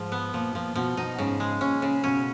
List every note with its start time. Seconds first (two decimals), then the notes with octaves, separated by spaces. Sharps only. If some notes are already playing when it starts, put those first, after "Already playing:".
Already playing: G#2 F3
0.12 B3
0.34 A#2 F3
0.55 A#2 F3
0.75 B2 F3
0.97 B2 D#4
1.18 G#2 C#3
1.40 G#3
1.61 A#2 C#4
1.82 C#3
2.04 B2 C#4